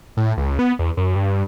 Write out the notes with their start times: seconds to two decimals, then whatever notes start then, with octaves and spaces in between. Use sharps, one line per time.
0.17 A2
0.37 C#2
0.59 B3
0.79 E2
0.97 F#2
1.15 G2